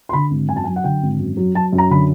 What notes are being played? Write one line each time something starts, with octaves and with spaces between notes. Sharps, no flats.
C6
D3 B5
G#1
F#2 G#5
A5
G#5
F#3
F#5
D3 G5
G#1
F#2
F#3
F#3 A5
F#2
A#5
D3 B5